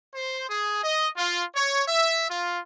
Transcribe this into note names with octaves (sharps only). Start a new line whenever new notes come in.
C5
G#4
D#5
F4
C#5
E5
F4